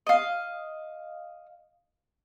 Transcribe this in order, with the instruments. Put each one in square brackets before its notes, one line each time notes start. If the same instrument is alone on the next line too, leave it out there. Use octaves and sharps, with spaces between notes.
[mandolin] D#5 F5